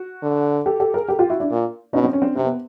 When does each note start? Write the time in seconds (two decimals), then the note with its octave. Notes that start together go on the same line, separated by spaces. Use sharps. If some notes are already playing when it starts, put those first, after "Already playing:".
Already playing: F#4
0.23 D3
0.66 G4 A4
0.80 G4 A4
0.94 G#4 A#4
1.08 G4 A4
1.19 F4 G4
1.29 E4 F#4
1.40 D4 E4
1.51 A#2
1.93 B2 C#4 D#4
2.04 C4
2.13 C#4
2.22 C4 D4
2.36 C3 C4
2.45 B3